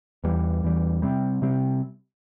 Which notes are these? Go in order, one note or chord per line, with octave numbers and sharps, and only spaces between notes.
E2 E3 G3
E2 E3 G3
C3 G3 C4
C3 G3 C4